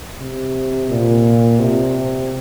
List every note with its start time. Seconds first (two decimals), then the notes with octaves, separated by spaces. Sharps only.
0.19 C3
0.90 A#2
1.59 C3